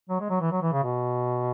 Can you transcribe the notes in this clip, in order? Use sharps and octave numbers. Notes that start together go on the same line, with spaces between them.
F#3
G#3
F#3
E3
F#3
E3
C#3
B2